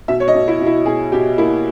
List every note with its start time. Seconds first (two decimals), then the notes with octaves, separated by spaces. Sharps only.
0.08 B2 E5
0.20 C#5
0.28 D#5
0.34 B2
0.48 E4
0.61 B2
0.67 E4
0.86 B2 G#4
1.12 B2 G4
1.38 A#3 E4